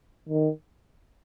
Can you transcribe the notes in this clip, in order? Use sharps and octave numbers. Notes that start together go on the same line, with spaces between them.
D#3